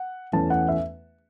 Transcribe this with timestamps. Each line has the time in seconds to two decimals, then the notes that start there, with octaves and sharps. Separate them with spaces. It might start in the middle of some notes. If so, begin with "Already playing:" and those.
Already playing: F#5
0.33 E2 E3 A3 C#4 A5
0.50 F#5
0.69 E5